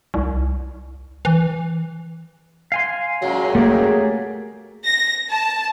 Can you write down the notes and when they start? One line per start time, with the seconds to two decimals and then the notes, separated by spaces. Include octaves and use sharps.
0.14 C2
1.25 E3
2.72 F5 G#5 C6
3.22 F#2 A#2 F#3 G#3
3.55 A3 A#3 G4 G#4
4.84 A#6
5.29 A5